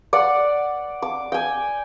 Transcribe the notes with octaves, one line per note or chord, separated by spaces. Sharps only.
D5 F#5
D6
G5 G#5